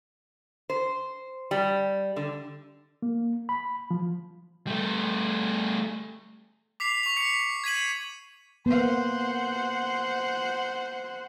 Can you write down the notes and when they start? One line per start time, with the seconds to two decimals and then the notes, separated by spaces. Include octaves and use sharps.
0.70 C5
1.51 G3
2.16 D3
3.02 A#3
3.49 B5
3.91 F3
4.67 G3 A3
6.80 D6 B6 C7 F7
7.03 C#6 F7
7.17 B6 C#7
7.64 G#6 B6 D#7 F#7
8.66 A#3 B3 C5 F#5